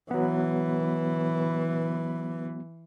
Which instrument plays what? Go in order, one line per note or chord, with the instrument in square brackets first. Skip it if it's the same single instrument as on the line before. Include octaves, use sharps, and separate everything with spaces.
[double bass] E3 [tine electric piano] F#3 B3